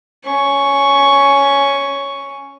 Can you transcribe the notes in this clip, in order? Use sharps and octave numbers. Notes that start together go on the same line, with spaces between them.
C#4 C#6